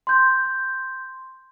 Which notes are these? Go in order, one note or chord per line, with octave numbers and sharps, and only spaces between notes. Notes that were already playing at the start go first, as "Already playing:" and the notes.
C6 G6